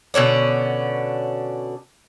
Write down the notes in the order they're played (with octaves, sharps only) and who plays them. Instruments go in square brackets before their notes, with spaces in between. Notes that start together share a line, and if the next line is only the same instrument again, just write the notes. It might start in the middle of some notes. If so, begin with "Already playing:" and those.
[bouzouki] B2 D3 C#4 D4